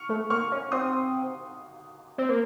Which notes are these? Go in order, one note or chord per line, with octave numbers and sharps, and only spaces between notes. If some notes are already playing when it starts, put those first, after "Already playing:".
Already playing: C#6 F6
A3
A#3 C#6 F6
C#4
C4 C6 D#6
C4
A#3